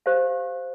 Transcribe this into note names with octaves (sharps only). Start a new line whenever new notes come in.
G4 C5 F5